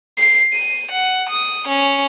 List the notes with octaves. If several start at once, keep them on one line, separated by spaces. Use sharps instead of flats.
C7
D#7
F#5
D#6
C#4